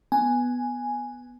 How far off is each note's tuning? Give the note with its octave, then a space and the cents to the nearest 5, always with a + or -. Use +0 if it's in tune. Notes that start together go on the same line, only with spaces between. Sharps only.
B3 +0 G#5 +0